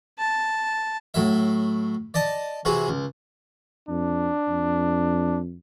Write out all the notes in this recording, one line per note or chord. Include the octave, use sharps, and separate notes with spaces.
A5
A2 F#3 E5
D5 D#5 A5
C3 E3 F#4 G#4
C#2
F2 D4
F2